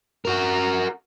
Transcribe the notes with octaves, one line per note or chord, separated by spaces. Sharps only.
F#4 A#4